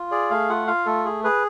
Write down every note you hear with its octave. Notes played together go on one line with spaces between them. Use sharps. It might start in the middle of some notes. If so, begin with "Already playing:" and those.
Already playing: F4
G#4 D5
A3 F5
F4 F#5
F4 F5
A3 A4
G#4
G#4 B4